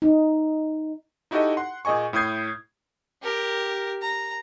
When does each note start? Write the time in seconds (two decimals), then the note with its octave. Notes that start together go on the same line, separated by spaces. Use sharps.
0.02 D#4
1.31 D#4 E4 F#4 G4 A4 D#5
1.57 F#5 C6
1.85 A#2 G#4 D#5 G#5 C#6
2.13 A2 E4 D#6 G6 G#6 C7
3.23 G4 A#4
4.02 A#5